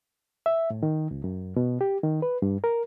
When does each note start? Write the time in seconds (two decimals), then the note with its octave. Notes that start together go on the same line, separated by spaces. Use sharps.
0.46 E5
0.70 A2
0.83 D#3
1.11 C#2
1.24 F#2
1.56 B2
1.81 G4
2.03 D#3
2.22 B4
2.42 G2
2.64 A#4